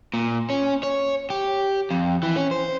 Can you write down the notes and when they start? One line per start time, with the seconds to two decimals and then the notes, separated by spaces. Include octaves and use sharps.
0.14 A#2
0.50 C#4
0.83 C#5
1.30 G4
1.91 F2
2.23 E3
2.36 C#4
2.51 C5